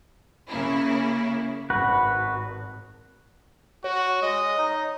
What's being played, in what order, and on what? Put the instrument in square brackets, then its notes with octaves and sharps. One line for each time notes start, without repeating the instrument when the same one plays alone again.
[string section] C#3 A#3 E4
[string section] G#1 [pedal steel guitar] F#4 B4
[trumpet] F#4 [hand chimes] C#5
[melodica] G#3 [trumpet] D#5
[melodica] D#4